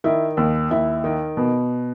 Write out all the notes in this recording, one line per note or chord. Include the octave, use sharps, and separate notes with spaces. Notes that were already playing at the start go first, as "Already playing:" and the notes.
D#3 E4
D#2
D#2 E4
D#3
B2